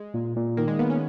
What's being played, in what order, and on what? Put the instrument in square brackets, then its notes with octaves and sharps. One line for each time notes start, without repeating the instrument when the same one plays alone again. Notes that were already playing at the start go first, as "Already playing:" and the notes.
Already playing: [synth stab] G#3
[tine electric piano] A#2
A#2
[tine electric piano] D#3 [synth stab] A#3
[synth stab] G#3
[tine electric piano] A#3 [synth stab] B3
[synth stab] C#4